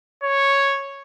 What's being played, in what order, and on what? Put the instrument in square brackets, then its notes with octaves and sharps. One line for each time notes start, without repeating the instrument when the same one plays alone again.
[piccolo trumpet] C#5